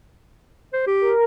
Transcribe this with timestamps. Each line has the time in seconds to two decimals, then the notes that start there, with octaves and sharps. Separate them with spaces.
0.73 C5
0.87 G4
1.01 A#4